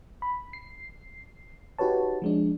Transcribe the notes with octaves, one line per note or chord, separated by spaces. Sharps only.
B5
C7
D#4 F#4 G4 B4 C#5 A5
F3 G#3 D4